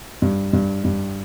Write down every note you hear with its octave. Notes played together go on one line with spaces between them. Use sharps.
G2
G2
G2